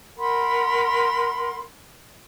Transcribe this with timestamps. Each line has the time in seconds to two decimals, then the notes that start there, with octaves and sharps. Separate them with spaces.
0.18 A#4 F#5 B5 C6